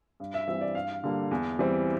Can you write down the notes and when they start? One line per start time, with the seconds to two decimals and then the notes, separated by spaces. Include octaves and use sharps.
0.20 G2
0.34 E5
0.48 E3 G3 C4 E5
0.61 D5
0.75 G2 F5
1.04 D3 G3 A#3
1.31 E2
1.59 E3 G3 C4